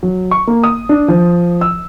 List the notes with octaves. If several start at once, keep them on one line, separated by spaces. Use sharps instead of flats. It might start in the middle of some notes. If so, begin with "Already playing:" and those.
F#3
C#6
A#3
D#6
D4
F3
E6